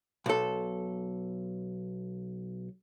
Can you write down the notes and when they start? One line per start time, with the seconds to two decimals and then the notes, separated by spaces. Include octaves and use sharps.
0.26 B1 A4